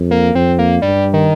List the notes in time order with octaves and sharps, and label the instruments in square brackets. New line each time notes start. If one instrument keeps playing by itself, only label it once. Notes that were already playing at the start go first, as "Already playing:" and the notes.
Already playing: [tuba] F2
[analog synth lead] A#3
[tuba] F2 [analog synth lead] C4
[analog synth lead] A#3
[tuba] G2 [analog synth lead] G3
[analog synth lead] D#3